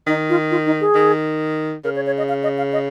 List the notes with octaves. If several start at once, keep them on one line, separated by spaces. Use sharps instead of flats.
D#3 D#4
F4
F4
D#4
G#4
D#3
C#3 A#4
C#5
C#5
D#5
F5
D#5
F5
D#5